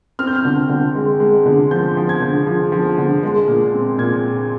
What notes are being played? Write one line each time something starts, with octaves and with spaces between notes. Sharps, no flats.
C4 F6
G6
F6
D3
D3
G#3
G#3
D3
F3 G6
F3
G#6
D3
F3
F3
D3
G#3
A#2
C4
A#2 G#6